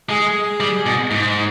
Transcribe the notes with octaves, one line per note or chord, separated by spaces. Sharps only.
G#3 G#4
G3
B2
G#2